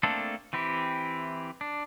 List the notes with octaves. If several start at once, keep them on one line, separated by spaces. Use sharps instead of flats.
A3 A#3 C4 D4 A4
E3 C4 E4 G4
D4